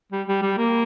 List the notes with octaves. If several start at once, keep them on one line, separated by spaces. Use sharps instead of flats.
G3
G3
G3
A#3